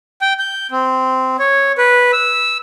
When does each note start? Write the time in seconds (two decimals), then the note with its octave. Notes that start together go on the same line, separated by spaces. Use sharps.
0.22 G5
0.39 G6
0.71 C4
1.39 C#5
1.78 B4
2.13 E6